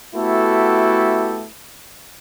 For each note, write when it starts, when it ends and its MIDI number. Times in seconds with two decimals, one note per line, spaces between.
0.15 1.46 57
0.15 1.46 59
0.15 1.46 64
0.15 1.46 66
0.15 1.46 67
0.15 1.46 69